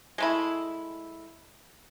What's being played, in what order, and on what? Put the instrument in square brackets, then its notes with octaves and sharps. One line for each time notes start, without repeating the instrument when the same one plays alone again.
[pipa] G#3 A3 E4